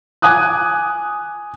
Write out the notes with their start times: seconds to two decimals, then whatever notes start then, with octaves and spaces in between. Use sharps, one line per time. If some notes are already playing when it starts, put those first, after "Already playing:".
0.22 G#5 D6 D#6 F#6